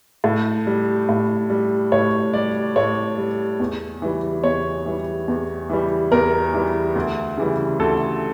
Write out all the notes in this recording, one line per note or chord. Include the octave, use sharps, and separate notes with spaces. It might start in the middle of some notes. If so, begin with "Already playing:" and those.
A2
G3
A2
G3
A2 C#5
G3 D5
A2 C#5
G3
E2
E3 G3
E2 C#5
E3 G3
E2
E3 G3
E2 A#4
E3 G3
D2
C#3 E3 G3
D2 A4